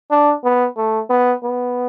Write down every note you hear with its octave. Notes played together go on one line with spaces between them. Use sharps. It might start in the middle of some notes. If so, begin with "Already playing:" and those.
D4
B3
A3
B3
B3